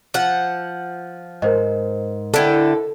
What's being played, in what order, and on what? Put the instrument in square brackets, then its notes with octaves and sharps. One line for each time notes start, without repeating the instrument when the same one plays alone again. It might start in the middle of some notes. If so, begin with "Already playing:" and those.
[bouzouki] F3 F#5
[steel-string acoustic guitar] G#2 [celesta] A#4 C5 D#5
[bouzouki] D3 E4 G5 [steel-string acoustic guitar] A4